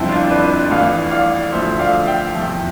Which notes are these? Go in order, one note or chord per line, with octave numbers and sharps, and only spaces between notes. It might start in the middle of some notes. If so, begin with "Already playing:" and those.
Already playing: G1 F2 C3 F3 C4 E4
D4 F4
B4 D5
A1 A2 E3 D5 F5
D5 F5
D2 D3 F3 C5 E5
D5 F5
E5 G5
E2 C3 F3